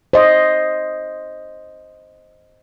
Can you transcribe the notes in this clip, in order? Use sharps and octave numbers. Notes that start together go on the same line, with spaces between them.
C5 D#5